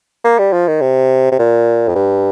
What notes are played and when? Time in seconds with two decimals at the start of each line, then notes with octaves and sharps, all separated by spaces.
0.25 A#3
0.39 G3
0.53 F3
0.68 D#3
0.81 C3
1.32 C3
1.39 A#2
1.89 F2
1.95 G2